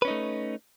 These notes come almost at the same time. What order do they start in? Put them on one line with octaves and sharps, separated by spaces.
B4 C#4 D#4 A3